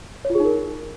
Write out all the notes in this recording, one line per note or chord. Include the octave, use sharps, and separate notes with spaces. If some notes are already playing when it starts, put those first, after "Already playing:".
C#5
F4
G#4
D#4
A#4